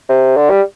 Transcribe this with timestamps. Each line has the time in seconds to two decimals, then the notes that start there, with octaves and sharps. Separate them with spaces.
0.09 C3
0.36 D3
0.50 G3